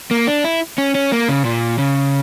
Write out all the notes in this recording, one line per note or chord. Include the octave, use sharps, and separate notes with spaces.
A#3
D4
E4
C#4
C#4
A#3
C#3
A#2
C#3